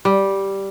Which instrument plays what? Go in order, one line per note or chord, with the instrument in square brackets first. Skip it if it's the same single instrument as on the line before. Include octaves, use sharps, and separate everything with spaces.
[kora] G3